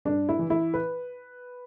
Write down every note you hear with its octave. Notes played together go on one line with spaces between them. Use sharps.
G2 D4
E4
E3
E4
B4